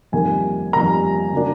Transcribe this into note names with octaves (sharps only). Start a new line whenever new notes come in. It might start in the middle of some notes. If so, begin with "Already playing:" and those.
F2 C3 D#3 G3 A#3 G#5
F2 C3 D#3 G3 A#3 A#5
C#3 F#3 A#3 D4